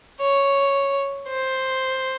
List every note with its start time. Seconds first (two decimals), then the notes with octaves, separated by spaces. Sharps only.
0.21 C#5
1.29 C5